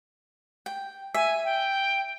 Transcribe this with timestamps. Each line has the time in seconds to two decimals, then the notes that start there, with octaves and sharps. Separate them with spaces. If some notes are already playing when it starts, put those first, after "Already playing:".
0.66 G5
1.14 E5 G#5
1.45 G5